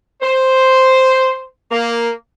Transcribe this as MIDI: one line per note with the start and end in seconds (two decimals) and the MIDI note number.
0.22 1.43 72
1.71 2.09 58